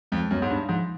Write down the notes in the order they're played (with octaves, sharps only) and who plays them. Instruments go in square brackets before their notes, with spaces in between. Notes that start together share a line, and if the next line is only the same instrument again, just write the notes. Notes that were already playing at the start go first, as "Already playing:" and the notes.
[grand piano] F2 [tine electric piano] G#3
[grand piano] F#2 [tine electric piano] B3
[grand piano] G#2
[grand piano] G2 [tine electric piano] D4
[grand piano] G#2 [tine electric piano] F3